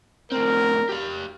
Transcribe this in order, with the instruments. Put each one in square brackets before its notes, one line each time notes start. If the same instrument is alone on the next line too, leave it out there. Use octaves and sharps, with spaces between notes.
[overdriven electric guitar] A2 C4 [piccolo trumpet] A#4
[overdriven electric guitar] G4 F5